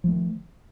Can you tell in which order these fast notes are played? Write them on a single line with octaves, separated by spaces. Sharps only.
F3 A3 D#3